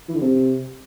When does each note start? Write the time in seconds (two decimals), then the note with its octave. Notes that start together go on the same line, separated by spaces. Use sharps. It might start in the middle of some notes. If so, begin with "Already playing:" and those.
0.09 E3
0.15 D3
0.21 C3